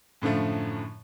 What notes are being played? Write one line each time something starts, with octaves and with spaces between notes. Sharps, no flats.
F#2 A2 D3 F3 A3